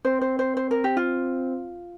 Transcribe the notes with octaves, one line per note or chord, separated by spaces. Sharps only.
C4 C5
C5
C5
C5
A#4
G4
F4